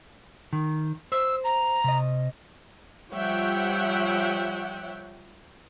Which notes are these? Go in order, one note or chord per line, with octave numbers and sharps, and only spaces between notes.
D#3
C5 E6
A#5
C3 D#5
F3 G3 C#5 E5 F#5 G5